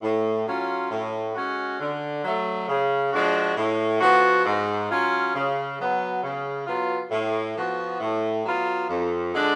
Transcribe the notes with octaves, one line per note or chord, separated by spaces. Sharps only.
A2
F#3 C#4 F4
A2
G#3 C#4 F#4
D3
F#3 A3
C#3
F3 G#3 D4 F#4
A2
F3 B3 F#4
G#2
F#3 C#4 F4
C#3
F#3 B3
C#3
F#3 B3 F4
A2
F3 B3 F#4
A2
F#3 B3 F4
F2
D3 G#3 D4